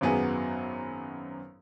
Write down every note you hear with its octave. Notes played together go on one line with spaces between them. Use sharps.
G#1 F#2 F#3 B3 G#4